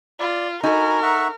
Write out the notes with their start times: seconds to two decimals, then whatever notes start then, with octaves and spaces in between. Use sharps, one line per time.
0.20 F4 D5
0.63 D#4 F#4 A4 A#4 G#5 B5
1.02 E5 F#5 C#6